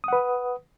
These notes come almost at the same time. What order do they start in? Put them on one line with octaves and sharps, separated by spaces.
D#6 F#5 B4